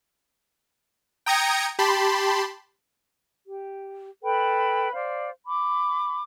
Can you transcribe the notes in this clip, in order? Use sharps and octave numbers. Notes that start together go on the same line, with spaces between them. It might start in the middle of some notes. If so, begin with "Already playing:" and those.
G5 A#5 D#6 G#6 A#6 C#7
G4 A5 B5 C6
G4
A4 B4 G5 B5
C5 D5 F5
B5 D6